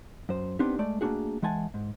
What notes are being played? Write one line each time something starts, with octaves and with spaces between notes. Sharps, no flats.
F#2 C5
B3 C4 D4 D#4 G4
G#3 A3 D5
A3 A#3 C#4 D4 F#4 G#4
E3 G#3 F#5 G#5 A5
G#2